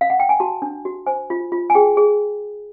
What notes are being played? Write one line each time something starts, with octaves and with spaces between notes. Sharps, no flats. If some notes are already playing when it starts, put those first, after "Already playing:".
F5
F#5
G5
G#5
F#4 A5
D4
F#4
C5 G#5
F4
F4
G#5
G#4 G5
G#4